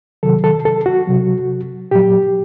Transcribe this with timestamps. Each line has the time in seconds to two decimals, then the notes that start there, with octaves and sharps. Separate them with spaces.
0.23 C3 D#3 F#3 A4
0.44 A4
0.65 A4
0.86 F#4
1.07 C3 F#3
1.91 A#2 F#3 G4